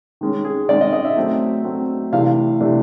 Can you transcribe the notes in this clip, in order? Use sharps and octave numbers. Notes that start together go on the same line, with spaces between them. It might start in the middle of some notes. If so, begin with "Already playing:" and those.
D#3 G#3 C#4
G#4
D#3 G#3 C#4 D5
D#5
D#5
E5
F#3 A3 C4
F#3 A3 C4
C3 E3 A3 D4 F5
C3 E3 A3 D4